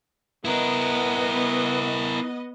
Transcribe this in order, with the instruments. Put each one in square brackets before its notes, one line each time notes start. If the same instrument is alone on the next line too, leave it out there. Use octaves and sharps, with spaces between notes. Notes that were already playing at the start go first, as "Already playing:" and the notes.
[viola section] B3 D#5 [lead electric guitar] E4 A#4